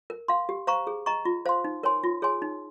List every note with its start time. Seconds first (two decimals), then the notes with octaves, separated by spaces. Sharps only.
0.10 A#4
0.28 F5 C6
0.49 G4
0.67 C5 F5 A#5 C#6
0.87 G#4
1.06 D#5 A#5 C#6
1.25 F4
1.46 C5 F5 C6
1.64 D#4
1.83 A#4 C#5 G#5 C6
2.04 F4
2.22 G#4 C#5 G#5 C6
2.42 D#4